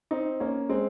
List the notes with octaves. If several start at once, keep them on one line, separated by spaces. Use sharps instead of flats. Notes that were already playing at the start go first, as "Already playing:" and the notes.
C4 D#4
A#3 C#4
G#3 C4